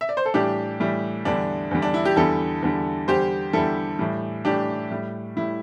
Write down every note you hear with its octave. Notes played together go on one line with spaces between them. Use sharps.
E5
D5
C5
A4
A2 E3 G3 D4 G4
A2 E3 G3
E2 D3 G3 D4
E2 D3 G3
D4
E4
G4
E2 D3 G3 E4 A4
E2 D3 G3
E2 D3 G3 G4 C5
E2 D3 G3 E4 A4
A2 E3 G3
A2 E3 G3 D4 G4
A2 G3
A2 G3 E4